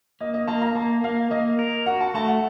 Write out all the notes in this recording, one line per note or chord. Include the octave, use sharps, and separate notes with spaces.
A#3 D#5
D#5
A#3 A5
A#5
A#3 A5
A#3 F5
A#3 D#5
A#4
F#4 F#5
A5
A3 A5
F#5